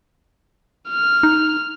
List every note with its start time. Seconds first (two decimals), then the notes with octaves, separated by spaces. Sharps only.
0.90 F6
1.23 D#4